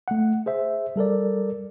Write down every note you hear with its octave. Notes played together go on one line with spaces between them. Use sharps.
A3 F#5
G#4 C5 E5
G3 A4 A#4 D5